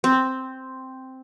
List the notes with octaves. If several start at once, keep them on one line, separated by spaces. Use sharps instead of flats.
C4